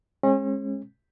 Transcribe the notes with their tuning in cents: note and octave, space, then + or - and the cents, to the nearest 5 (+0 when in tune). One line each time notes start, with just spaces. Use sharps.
G#3 +0 C#4 -40